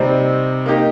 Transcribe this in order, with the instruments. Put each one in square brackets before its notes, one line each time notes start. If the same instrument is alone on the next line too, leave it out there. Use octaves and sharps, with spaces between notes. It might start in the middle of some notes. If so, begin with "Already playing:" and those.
Already playing: [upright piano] C3 G3 C4 D#4
A#3 D#4 G4